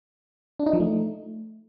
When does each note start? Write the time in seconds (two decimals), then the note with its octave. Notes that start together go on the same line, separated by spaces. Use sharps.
0.60 D4
0.66 D#4
0.73 F3
0.80 A3